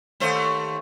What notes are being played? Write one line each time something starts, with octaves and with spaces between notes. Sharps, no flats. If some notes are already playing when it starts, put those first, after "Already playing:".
D#2 A3 C5